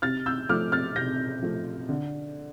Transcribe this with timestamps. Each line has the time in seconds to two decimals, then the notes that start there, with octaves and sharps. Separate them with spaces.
0.02 C3 F6 A6
0.26 E6 G6
0.49 F3 A3 D6 F6
0.72 F6 A6
0.96 C3 G6 A#6
1.43 F3 A3
1.89 D3